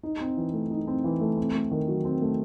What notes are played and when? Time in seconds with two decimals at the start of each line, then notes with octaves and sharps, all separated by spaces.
0.03 D#4
0.21 C4
0.37 E3
0.54 A3
0.71 D#4
0.87 C4
1.04 E3
1.21 A3
1.37 C4
1.55 A3
1.71 D#3
1.88 F#3
2.05 C4
2.21 A3